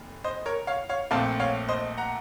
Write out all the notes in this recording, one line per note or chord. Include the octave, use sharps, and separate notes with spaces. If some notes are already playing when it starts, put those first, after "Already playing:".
Already playing: F1 D#2
C5 D#5
A#4 C#5
C#5 F5
C#5 F5
A#1 A#2 A3 C4 F5 A5
C#5 F5
C5 D#5
F#5 A#5